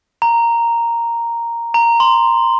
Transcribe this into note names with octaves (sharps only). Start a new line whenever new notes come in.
A#5
A#5
C6